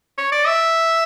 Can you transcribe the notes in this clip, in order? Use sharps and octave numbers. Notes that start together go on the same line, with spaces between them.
C#5
D5
E5